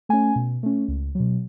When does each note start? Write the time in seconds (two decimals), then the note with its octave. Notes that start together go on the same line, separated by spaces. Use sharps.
0.09 A3 C#4 G#5
0.36 B2
0.63 A3 C#4
0.88 C#2
1.15 B2 F#3